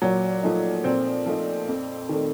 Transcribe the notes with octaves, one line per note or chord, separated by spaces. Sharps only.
A#2 F#3
F3 A3 D#4
A#2 C4
F3 A3 D#4
F2
D#3 A3